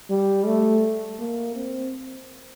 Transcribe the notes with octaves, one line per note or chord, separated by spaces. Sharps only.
G3
A3
A#3
C4